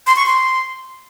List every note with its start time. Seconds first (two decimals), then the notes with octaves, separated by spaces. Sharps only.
0.07 C6
0.16 C#6
0.26 C6